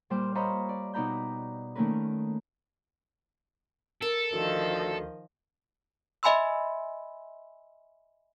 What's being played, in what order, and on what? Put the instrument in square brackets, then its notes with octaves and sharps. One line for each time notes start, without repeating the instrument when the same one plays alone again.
[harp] A#2 G3 C5 G5 D6 F6
C5 C#5 D#5 F5 A#5 B5
D5
B2 D#4 D5 A#5 B5 G6
D#3 A3 A#3 C#4 A#4 B4
[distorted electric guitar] A4 [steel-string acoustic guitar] A#4
[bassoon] D2 [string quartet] D#3 F3 D#5
[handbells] D#5 E5 G#5 B5 C6 E6